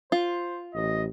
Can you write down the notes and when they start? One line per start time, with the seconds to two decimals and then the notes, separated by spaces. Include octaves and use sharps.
0.12 F4 C5
0.74 A1 D#5